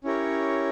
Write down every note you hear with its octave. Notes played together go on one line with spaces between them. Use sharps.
C#4 E4 G4 A#4 C#5